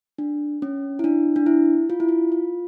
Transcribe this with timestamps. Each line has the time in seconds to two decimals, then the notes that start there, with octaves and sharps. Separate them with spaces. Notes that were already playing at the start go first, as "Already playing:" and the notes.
0.18 D4
0.62 C#4
0.99 E4
1.04 D4
1.36 D4
1.46 E4
1.90 F4
2.00 E4
2.08 F4
2.32 F4